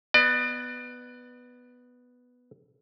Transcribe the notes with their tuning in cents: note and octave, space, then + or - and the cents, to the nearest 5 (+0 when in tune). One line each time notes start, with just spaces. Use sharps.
B3 +0 D5 +35